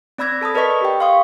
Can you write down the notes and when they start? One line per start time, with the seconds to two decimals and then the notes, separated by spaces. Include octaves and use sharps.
0.18 C4 D5 B5 E6 G#6 A#6
0.41 A4 A5 B5 D#6
0.55 A#4 B4 D5 D#5 C#6 B6
0.81 G4 G5
1.00 F5 C6 C#6 D#6